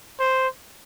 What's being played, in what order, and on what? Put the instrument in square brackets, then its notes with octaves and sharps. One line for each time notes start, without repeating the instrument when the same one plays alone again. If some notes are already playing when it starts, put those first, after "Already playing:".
[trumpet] C5